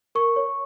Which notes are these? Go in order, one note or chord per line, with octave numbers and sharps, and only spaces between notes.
A#4 C#6
C#5